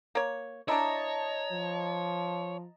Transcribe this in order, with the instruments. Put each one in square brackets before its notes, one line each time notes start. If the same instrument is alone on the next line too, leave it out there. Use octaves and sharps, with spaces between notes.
[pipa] A#3 C#5
[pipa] D4 E4 [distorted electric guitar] C#5 [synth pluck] D#5 A5 A#5
[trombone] F3